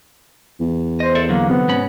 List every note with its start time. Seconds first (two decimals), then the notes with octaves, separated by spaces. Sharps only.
0.60 E2
1.00 C5 D#5
1.15 A4 D5 E5
1.29 D3 F#3 A#3
1.49 C3 B3
1.68 G#2 C#4 B5